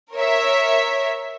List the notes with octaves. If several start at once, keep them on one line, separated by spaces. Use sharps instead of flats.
A#4 C#5 E5